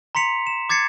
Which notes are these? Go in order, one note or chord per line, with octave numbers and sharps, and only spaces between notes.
A#5 C6 B6 C#7 F7
E7
D6 G#6 A6 C7 C#7